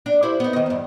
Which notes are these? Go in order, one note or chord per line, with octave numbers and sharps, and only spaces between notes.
D4
E4 G4 C5
B3 D#4
D#3 D#5
E2 G2